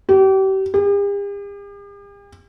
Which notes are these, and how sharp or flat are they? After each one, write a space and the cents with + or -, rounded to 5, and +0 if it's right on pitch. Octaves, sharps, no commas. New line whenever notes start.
G4 -35
G4 +45